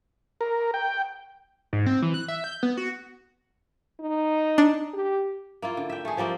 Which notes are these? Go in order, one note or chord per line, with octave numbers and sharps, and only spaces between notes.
A#4
G5
G#2
C4
E3
F#6
E5
G6
B3
F#4
D#4
D4
G4
A#3 E4 F4
D3
E5 G5
A3 G#4
F3 G3 A#3 C4